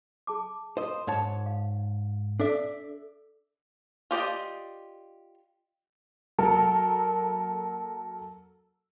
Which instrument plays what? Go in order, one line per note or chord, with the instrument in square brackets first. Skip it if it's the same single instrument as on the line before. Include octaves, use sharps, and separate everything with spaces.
[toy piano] G#4 A5 D6
[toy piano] F4 A#4 [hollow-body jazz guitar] C5 D#5
[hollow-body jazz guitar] G#2 C#5 A5
[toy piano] F5
[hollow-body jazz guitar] D4 D5 E5 [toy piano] A4
[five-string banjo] F4 G4 D5 D#5
[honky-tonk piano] F#3 A#3 A4 A#4